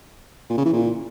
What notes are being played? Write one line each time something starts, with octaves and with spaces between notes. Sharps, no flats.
A#2
C#3
E3
A#2